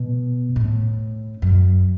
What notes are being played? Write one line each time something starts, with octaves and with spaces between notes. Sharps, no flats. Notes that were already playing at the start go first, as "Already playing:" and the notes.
Already playing: B2
A2
F#2